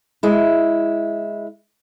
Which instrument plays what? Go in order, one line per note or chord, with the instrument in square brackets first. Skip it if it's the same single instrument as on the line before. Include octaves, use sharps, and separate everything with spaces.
[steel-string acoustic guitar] G#3 E4